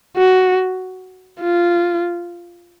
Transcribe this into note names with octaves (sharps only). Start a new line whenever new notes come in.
F#4
F4